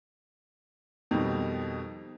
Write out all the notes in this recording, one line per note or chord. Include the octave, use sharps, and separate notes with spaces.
F2 B2 D#3 G3 C4 D#4